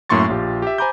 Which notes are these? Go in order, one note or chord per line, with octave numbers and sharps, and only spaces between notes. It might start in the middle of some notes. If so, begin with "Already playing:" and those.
F#2 A2 A#3 C6 C#6 A6
A#1 F4 G4
G4 E5
C5 G#5 A#5 B5 D6 G6